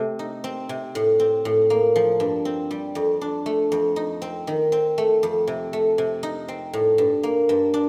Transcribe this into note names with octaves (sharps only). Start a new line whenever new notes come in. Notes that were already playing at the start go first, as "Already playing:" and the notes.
Already playing: C3 A3
D#4
C4
C3
A2
C4
A2
A#3
F3
G2
C4
G3
F2
D4
A3
F2
D#4
C4
D#3
C4
A3
F2
C3
A3
C3
D#4
C4
A2
G2
A#3
G2
D4